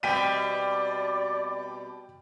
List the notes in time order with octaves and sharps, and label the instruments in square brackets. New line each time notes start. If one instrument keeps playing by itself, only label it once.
[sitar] B2 G3 C4 [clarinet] D5 [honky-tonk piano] G5 B6 D#7